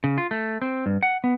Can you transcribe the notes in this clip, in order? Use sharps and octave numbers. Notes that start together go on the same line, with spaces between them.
C#3
F4
A3
C4
G2
F#5
B3